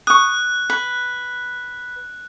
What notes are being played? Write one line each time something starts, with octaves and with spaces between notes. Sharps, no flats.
C#6 D#6 F#6
B4